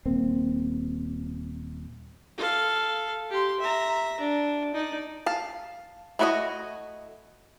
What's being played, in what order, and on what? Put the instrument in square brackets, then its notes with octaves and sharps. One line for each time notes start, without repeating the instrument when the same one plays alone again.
[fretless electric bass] D#1 A#3 C4
[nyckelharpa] A4 F5
G4 C6
E5 A#5
D4
D#4 D5
[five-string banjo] F5 A5
A3 E4 F#4 D5 D#5